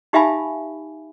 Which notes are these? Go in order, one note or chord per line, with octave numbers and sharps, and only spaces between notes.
D#4 G4 E5 F5 G#5 B5